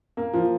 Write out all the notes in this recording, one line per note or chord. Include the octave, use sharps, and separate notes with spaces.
A#3
F3